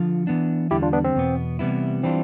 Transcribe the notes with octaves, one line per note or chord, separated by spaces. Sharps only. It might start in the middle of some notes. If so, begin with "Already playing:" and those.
Already playing: D3 F3 F4
E3 B3 D4
E2 D3 G3 E4 G4
D4 F4
B3 D4
C4
E2 B2 B3
C3 E3 G3 B3 E4
E3 G3 C4 D4 F4